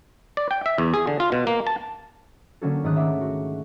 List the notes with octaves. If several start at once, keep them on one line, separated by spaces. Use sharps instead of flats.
D5
G5
E5
E2
G#4
D3
F4
B2
A#3
A5
D3 F#3 A#3 C#4 F#4 A4
G#2 D#3 A3 D#6 F#6
E5 F#5 D6 E6
F#4